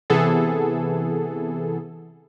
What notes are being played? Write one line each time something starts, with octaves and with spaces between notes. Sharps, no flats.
C3 E3 B3 G#4 A4